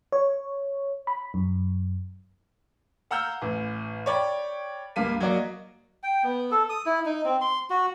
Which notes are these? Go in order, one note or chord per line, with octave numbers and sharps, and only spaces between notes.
C#5
B5
F#2
F5 F#5 A#5 E6 F6 G6
A1
C#5 D5 G5 B5
C#2 G2 A#3 F5 B6 D#7
F#3 A#3 F#4 D5 D#5 F5
G5
B3
A4
D#6
E4
D#4
C4
C6
F#4